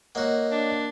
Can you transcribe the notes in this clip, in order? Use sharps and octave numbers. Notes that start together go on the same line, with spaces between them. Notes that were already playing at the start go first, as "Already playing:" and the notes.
A#3 F#4 C#5 D#5 F#5
D4